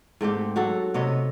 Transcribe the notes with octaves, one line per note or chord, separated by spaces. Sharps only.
G#2 A3 C4 G4
F#3 F#4 A4
C3 B3 C#5 D#5